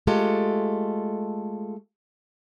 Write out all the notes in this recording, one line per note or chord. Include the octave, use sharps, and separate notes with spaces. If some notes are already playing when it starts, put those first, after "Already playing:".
G#3 A3 F4 G4 A4